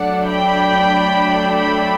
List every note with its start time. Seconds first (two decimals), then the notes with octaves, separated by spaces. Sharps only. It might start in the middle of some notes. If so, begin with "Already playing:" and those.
Already playing: F#3 A3 D4 D5 F#5
0.30 G5 B5
1.57 G5 B5